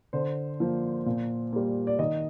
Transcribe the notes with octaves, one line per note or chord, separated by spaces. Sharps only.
D3 C5
F3 A#3
A#2
G3 A#3
D5
D#3 D#5